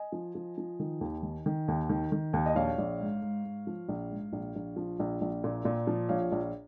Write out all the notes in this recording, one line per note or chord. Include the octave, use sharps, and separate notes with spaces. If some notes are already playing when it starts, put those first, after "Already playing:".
Already playing: D#5 G#5
F3
F3
F3
D#3
D#2
D#3
D#3
D#2
D#3
D#3
D#2
D#5
A#1 C#5 F5
A#1
G#2
G#2
G#2
F3
A#1
G#2
A#1
A#1
F3
A#1
A#1
A#2
A#2
F3
A#1 C#5 F5
A#1